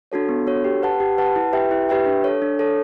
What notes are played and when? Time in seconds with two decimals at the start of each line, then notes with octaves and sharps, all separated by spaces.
0.12 D4 F#4 A4 C#5
0.29 B3
0.47 D4 F#4 A4 C#5
0.64 G4
0.82 B4 F#5 A5
1.00 G4
1.18 B4 F#5 A5
1.36 E4
1.53 G4 B4 E5 G5
1.71 E4
1.89 G4 B4 E5 G5
2.06 D4
2.24 A4 C#5
2.42 D4
2.59 A4 C#5